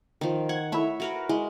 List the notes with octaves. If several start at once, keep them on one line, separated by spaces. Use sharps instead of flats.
D#3 F3
F#5 G#6
A3 E4 C#5 E5
F#4 A#4 B4
G#3 E4